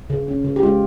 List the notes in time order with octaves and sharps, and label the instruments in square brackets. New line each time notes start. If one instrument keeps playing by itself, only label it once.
[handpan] C#3
C#4
C#3
G4
G#3 F4